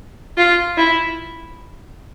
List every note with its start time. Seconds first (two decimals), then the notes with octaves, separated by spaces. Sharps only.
0.37 F4
0.77 E4